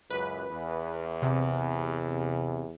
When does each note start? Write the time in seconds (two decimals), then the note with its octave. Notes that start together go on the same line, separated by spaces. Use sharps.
0.10 C#2 F#2 B4
0.51 E2
1.22 C3